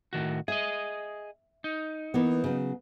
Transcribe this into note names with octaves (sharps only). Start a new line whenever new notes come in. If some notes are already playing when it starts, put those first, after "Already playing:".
A2 D#3 F#4
G#4 D#5 E5
D#4
E3 A#3 B3
C#3 F#3